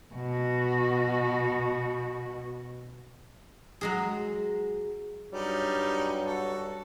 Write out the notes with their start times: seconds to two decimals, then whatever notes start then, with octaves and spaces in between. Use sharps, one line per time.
0.15 B2 F#4
3.81 F#3 G#3 G#4
5.33 G2 F#3 G3 C#4 D#4
6.24 F#4 A4